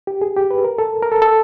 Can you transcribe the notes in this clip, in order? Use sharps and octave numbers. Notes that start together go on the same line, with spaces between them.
G4
G#4
G4
B4
A#4
A4
A#4
A4
A4